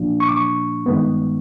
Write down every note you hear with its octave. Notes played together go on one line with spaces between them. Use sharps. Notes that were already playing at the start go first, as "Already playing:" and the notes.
Already playing: A#2 F3 A#3 D4 F4
C#6
D6
C#6
G2 D#3 G#3 B3